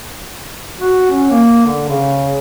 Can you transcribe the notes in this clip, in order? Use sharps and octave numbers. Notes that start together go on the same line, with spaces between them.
F#4
C#4
A#3
D3
C#3